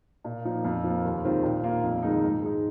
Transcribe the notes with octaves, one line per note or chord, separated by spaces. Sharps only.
A#2
F3 A#3 D#4
F2
F3
A#3
D#2
D#3 G#3 C4 F4
A#2
A#3 F4
F2
D#3 G#3 D#4
G#2
G#3 D#4